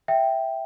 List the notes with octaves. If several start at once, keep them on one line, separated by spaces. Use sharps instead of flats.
E5 G5